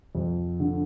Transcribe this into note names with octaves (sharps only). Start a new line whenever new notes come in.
F2
D3